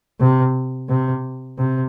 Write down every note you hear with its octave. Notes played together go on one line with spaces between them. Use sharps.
C3
C3
C3